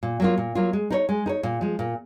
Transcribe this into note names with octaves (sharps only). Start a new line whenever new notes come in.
A#2
F#3 A#3 F4
A#2
F#3 A#3 F4
G#3
D#4 A#4 C#5
G#3
D#4 A#4 C#5
A#2
F3 G#3
A#2